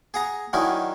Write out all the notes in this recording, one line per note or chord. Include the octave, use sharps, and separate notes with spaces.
G#4 F#5 A#5
D3 D#3 F#3 C#4 D#4 E4